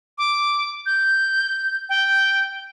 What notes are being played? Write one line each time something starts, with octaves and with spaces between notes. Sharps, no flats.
D6
G6
G5